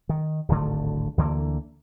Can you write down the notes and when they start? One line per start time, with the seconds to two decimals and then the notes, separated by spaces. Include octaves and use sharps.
0.09 D#3
0.49 D1 G#1 D3 A3
1.18 D2 D3 E3 A#3